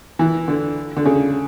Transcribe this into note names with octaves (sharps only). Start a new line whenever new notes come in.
E3
D3
D3
C#3